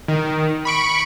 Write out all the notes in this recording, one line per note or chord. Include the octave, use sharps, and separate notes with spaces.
D#3
B5 C#6 D7